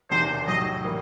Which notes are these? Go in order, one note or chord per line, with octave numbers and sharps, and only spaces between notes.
E1 E2 C3 D#3 C5
B1 A2 F#3 D#5
A2 E3 G3 A#3